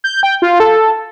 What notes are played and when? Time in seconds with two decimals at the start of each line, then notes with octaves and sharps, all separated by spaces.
0.04 G6
0.23 G5
0.42 F4
0.60 A4